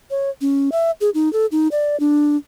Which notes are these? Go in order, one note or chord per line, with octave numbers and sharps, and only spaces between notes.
C#5
C#4
E5
G#4
D#4
A4
D#4
D5
D4